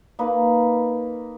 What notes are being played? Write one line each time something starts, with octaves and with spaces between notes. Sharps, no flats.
A#3 D#4 B4